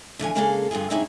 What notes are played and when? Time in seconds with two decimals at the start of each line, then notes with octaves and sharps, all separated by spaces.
0.19 E2 D3 F3 G#5
0.35 C#3 G#3 A#3 G#4 A4 F5
0.71 G2 D3 F4 G#4
0.90 G2 C3 D#4 E4 G#4 C#5